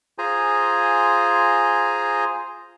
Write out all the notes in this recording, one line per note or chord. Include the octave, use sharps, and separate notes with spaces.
F4 G#4 C5 G#5 A#5